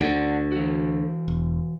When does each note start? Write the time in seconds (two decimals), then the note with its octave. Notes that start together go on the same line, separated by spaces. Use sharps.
0.01 D2 D5 F#5
0.52 E3 F#4
1.28 E1